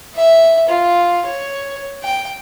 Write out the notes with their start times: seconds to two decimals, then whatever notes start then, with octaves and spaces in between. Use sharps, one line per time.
0.15 E5
0.69 F4
1.26 C#5
2.03 G5